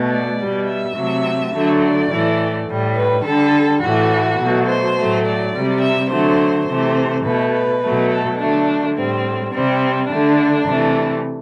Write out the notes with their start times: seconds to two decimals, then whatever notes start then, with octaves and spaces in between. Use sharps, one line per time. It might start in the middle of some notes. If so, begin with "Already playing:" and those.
Already playing: B2 A3
0.09 D5
0.38 B2 G3
0.67 E5
0.95 C3 F#3 A3
1.52 D3 F#3 A3
1.82 D5
2.10 A2 E3 A3
2.67 A2 G3
2.96 B4
3.24 D3 G3 A4
3.81 A2 E3 A3 F#4
4.38 B2 F#3 A3
4.66 C5
4.95 A2 F#3 A3
5.24 D5
5.52 C3 G3
5.80 E5
6.09 D3 F#3 A3 C5
6.66 C3 E3 A3 C5
7.23 B2 A3 B4
7.52 B4
7.81 B2 F#3 A3
8.10 A4
8.38 D3 F#3 A3 D4
8.95 A2 G3 C4
9.52 C3 G3 C4
10.09 D3 A3 D4
10.66 C3 E3 A3